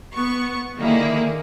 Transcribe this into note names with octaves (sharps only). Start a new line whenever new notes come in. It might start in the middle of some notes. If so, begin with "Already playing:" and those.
B3 C#6
D3 D#3 A#3 E4 G#4